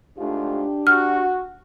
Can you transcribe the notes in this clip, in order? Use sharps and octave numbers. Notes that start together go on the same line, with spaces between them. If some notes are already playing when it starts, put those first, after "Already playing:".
G#2 A3 D4 F4 G4
F#4 F6